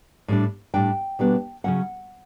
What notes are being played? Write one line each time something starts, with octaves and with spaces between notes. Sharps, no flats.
A2 G3 D4
A2 G3 D4 G5
B2 G3 B3 D4
C#3 F#3 C#4 F#5